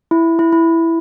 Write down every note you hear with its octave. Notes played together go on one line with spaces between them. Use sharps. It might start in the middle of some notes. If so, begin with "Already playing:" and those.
E4
E4
E4